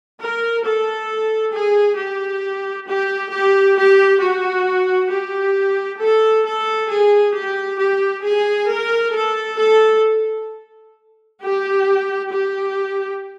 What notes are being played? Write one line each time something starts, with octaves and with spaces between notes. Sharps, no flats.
A#4
A4
G#4
G4
G4
G4
G4
F#4
G4
A4
A4
G#4
G4
G4
G#4
A#4
A4
A4
G4
G4